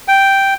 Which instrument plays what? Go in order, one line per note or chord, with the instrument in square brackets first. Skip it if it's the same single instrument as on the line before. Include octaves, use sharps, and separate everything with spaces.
[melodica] G5